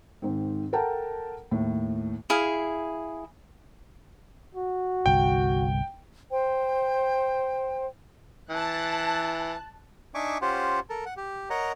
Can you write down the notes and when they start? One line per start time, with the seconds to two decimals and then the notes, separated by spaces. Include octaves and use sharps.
0.22 G#2 D#3 C4
0.73 A4 A#4 F#5 G5 A5 A#5
1.51 D#2 A2
2.30 E4 G#4 F5
4.55 F#4
5.06 G1 C2 G5
6.31 C5 G5
8.51 E3 A5 F#6
10.15 D4 D#4 E5 G#5 C#6 D6
10.42 C#4 F4 G4 C5 F#5
10.90 A4 A#4
11.06 F#5
11.17 G4
11.50 A#4 C#5 D#5 F#5 A#5